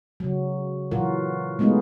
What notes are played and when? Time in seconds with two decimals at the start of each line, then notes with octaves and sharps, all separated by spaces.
0.20 C#3 F#3
0.91 A#2 E3 F#3 F4 F#4 A#4
1.59 G#3 A3 B3 D#4 F4